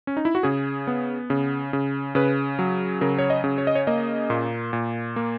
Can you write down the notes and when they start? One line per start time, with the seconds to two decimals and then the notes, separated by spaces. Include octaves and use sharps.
0.07 C#4
0.17 D#4
0.25 E4
0.35 F#4
0.43 C#3 G#4
0.87 B3
1.30 C#3
1.73 C#3
2.15 C#3 B4
2.59 F#3
3.01 C#3 A#4
3.19 C#5
3.30 D#5
3.44 C#3
3.58 C#5
3.67 D#5
3.75 C#5
3.87 A#3 D#5
4.30 A#2
4.73 A#2
5.16 A#3